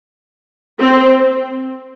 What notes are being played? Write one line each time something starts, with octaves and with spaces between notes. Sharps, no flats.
C4